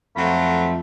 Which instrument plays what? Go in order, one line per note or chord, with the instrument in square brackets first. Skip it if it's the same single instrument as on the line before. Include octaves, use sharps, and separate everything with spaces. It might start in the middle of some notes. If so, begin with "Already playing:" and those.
[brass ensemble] F2 [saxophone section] F#3 C4 F4 [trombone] A3 [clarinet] B5